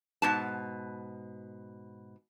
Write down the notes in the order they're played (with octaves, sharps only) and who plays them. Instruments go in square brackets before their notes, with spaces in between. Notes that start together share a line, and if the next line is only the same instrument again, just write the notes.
[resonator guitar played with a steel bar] G#2 B2 A5